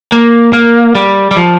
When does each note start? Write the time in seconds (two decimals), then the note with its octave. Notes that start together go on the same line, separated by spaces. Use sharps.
0.12 A#3
0.53 A#3
0.95 G3
1.31 G3
1.37 F3